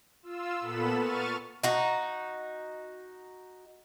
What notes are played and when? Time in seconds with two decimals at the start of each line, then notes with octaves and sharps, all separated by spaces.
0.23 F4 E6
0.60 A#2 B3 A4 B5 E7
0.98 C#6 F6 A6 D#7
1.63 D#4 F#4